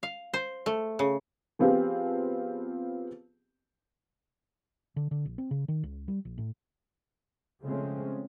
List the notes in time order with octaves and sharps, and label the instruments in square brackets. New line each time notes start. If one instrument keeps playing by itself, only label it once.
[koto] F5
C5
A3
C#3
[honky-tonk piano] F3 B3 C4 F4 G4 G#4
[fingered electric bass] D3
D3
A#1
C4
C#3
D#3
C#2
G3
A#1
A2
[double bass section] C#3 F3 G#3 A3 C4 C#4